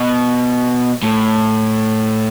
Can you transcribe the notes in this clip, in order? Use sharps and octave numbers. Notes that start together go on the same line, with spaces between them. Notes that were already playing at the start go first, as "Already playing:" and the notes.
Already playing: B2
A2